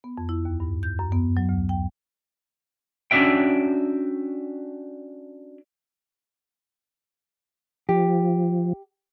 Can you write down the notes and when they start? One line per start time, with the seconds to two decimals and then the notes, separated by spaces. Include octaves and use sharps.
0.04 B3
0.18 F2
0.29 E4
0.45 D#2
0.60 G2
0.83 G6
0.99 F#2
1.12 B3
1.37 F#3
1.49 D2
1.69 G5
3.11 C#4 D4 F#4 E5 G5
7.89 F3 G4